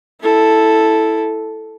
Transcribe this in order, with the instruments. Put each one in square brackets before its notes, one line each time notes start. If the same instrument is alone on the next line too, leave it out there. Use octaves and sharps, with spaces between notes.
[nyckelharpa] E4 A4